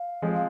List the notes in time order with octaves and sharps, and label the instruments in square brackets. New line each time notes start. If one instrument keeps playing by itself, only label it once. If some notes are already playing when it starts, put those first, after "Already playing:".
Already playing: [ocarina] F5
[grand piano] F3 G#3 C4